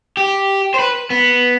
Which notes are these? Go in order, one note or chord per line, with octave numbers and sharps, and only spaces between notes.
G4
C5
B4
B3